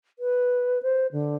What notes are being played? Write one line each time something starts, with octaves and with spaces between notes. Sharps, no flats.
B4
C5
D3